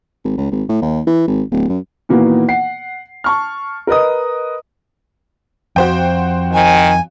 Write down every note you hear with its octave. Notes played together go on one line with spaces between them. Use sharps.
G#1
C#2
G#1
A2
D#2
E3
G#1
D1
F#2
A#2 D#3 E3 A#3 B3 F#4
F#5 C7
A5 C#6 F6
A#4 B4 D#5 D#6
F2 F#4 C5 G5
D#3 G#5